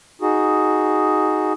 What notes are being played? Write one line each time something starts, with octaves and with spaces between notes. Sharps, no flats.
D#4 F#4 G#4